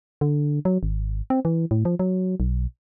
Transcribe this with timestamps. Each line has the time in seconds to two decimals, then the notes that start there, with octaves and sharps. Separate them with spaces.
0.21 D3
0.65 F#3
0.83 G#1
1.30 C4
1.45 E3
1.71 A2
1.85 F3
1.99 F#3
2.40 B1